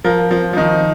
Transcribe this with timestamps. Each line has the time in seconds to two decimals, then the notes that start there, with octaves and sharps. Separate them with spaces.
0.04 F3 A#4
0.31 F3 C4
0.53 F3
0.57 D#3 D#4